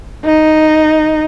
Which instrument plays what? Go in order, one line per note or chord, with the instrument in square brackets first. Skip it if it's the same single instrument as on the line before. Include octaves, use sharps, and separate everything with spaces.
[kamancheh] D#4